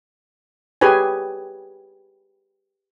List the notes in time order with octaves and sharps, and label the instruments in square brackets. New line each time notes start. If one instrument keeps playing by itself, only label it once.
[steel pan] G4 G#4 B4 C#5 G#5